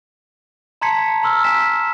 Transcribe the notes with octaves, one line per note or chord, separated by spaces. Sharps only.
A5 A#5 C6 G#6 B6 C#7
A#5 C6 E6 F6
G#5 B6 E7